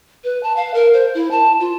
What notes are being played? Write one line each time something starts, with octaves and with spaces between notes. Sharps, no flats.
B4
A5
F5
A#4
C5
E4
A5
F4